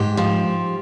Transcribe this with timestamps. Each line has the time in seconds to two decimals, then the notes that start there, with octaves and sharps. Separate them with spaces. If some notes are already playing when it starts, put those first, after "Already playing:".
Already playing: G#2 G4
0.17 F3